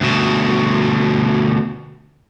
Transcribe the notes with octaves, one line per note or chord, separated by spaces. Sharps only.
D2 B2